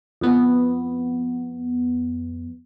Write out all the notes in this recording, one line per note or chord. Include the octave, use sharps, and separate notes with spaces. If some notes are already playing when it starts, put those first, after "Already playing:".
F2 B3